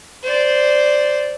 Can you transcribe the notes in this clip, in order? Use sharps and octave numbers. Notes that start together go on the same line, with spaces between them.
C5 D5